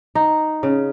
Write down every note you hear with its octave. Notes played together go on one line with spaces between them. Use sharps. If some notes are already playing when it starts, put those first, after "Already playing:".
D#4
C#3